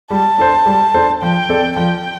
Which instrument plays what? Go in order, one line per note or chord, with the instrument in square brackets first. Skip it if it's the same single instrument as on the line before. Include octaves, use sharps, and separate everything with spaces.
[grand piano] G3 [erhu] A5
[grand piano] D4 A4 C5
G3
D4 A4 C5
[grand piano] F3 [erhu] G5
[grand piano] C4 A4 D5
[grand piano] F3 [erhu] G5